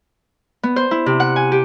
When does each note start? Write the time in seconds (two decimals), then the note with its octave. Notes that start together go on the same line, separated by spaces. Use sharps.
0.63 B3
0.76 C5
0.91 E4
1.06 C3
1.20 F#5
1.36 G#5
1.52 G4